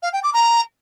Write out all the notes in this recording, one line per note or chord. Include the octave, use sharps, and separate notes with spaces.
F5
G5
D6
A#5